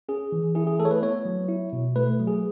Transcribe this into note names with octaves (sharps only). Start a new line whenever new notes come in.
C#4 G#4
E3
E4 G#4
G#4
A3 A4
C#5
B4
B3 C#5
F#3
E4
B2
A3 B4
F#3
G#4